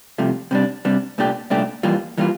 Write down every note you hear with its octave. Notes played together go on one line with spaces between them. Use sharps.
C2 C3 F3 A3
C3 G3 D4
C3 G3 D4
C2 A#2 A3 D4 G4
C2 A#2 A3 D4 G4
F2 E3 G3 A#3 F4
E3 G3 A#3 F4